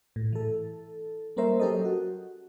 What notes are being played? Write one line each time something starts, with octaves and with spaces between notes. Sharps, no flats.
A2
E3 A4
G3 A#3 C#4 A#4 C5 E5
F#3 C#4 G4 A4 A#4 D#5
F#4